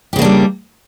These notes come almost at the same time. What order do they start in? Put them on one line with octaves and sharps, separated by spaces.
G4 C#3 A#3 D4 G3